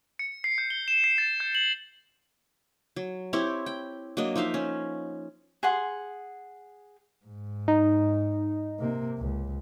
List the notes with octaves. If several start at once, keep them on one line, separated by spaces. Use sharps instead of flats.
C#7
C7
G6
G7
E7
C7
A6
G6
F#7
F#3
C4 E4 G4 C#5
G5
F#3 A#3 D4 D#5
F3 D#4 E5 F5
C#4
G#4 F#5 C6
G#2
D#4
C3 A#3
C#2